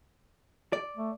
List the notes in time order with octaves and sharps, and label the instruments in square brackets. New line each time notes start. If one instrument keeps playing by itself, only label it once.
[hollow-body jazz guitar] D5
[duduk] A3